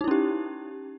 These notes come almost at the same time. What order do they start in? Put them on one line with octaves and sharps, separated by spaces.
D#4 E4 C#4 G4